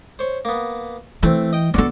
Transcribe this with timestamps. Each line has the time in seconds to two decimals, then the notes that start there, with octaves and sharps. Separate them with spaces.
0.19 C5 C#5
0.45 A#3 B3
1.23 E3 A3 C4
1.53 D#5 G5
1.74 B3 C4 D4 F#4 A4